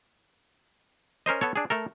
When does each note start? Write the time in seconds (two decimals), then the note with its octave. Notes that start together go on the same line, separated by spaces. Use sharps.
1.26 C#4 A#4 C5 D#5
1.41 B3 A4 C#5
1.56 D4 G#4
1.70 A3 A4 A#4